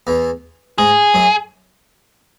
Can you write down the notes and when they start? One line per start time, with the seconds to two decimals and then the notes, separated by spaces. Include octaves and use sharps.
0.07 E2 E3
0.78 G#2 G#3 G#4
1.14 F#2 F#3